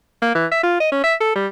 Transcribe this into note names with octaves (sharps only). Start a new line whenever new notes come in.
A#3
E3
E5
F4
D#5
C#4
E5
A4
G3